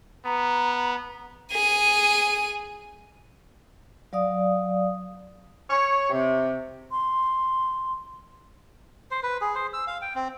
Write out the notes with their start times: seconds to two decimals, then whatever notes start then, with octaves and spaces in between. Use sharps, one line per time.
0.25 B3 A#5
1.52 G#4 D#7
4.13 F#3 D5 F5 D#6
5.70 C#5
6.10 C3
6.91 C6
9.11 C5
9.23 B4
9.41 G#4
9.55 C5
9.73 E6
9.87 F5
10.02 G5
10.15 C4